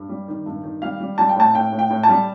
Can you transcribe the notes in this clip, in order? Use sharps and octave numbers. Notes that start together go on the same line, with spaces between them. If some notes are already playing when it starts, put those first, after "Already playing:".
Already playing: G2
G3
D#3
G2
D#3
G3 F5
G3
G3 A5
G5
A2 A5
A2 G5
A2
G5
A2
A5
G3